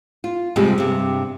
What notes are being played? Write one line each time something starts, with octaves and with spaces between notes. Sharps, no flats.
F4
F2 C3 F3 G3 G#3
G2 C3